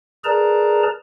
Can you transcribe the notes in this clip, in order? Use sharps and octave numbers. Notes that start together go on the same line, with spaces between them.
G#4 A#4 B4 D5 A5 A#5